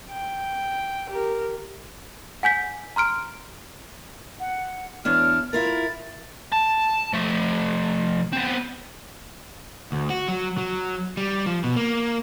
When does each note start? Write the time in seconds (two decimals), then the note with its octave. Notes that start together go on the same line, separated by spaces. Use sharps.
0.11 G5
1.10 G4 A#4
2.43 F#5 G#5 G6 B6
2.96 A#5 C6 F6 D7
4.40 F#5
5.05 E2 D4 C#5 F6
5.53 E4 F4 A#4 A6
6.53 A5
7.13 F3 A3
8.33 B3 C4
9.92 D2
10.10 F#4
10.28 F#3
10.58 F#3
11.17 G3
11.46 F3
11.64 B2
11.76 A#3